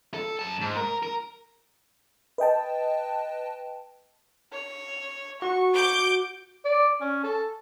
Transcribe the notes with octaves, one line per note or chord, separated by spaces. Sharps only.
A4
F#2 A5
G#2
A#4
A#4
B4 D#5 G5 A5
C#5
F#4 C#6
D6 G6 D7
D5
C#4
A4